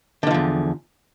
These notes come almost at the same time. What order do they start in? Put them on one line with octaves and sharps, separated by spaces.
D3 D#3 F3 E2